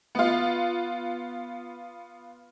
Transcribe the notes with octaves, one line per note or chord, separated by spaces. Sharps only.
B3 F4